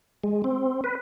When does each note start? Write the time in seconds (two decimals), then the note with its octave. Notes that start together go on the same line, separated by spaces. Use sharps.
0.24 G#3
0.44 C4
0.84 B4